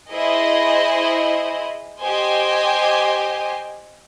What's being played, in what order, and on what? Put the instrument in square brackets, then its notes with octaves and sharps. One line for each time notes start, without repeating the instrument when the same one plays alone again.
[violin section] E4 G#4 C5 D#5
G4 C5 D#5 G#5